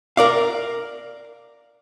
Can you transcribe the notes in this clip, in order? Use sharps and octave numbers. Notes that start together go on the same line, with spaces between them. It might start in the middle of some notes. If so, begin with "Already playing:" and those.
A#4 D5 F5